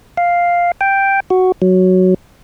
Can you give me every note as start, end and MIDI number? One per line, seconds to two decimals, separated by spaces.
0.17 0.72 77
0.81 1.20 79
1.30 1.52 66
1.62 2.14 54